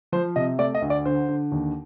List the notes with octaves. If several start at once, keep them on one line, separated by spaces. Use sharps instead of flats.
F3 C5
C3 D#5
A3 D5
D#5
D2
D5
D3 C5
D3
D#2